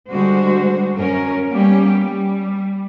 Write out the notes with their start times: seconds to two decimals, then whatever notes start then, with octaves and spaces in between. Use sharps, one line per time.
0.10 D3 G3 G#3 F#4 C5
0.95 F#2 C#4 A#4
1.51 G3 A#3 B3 C#4 G4
2.01 G3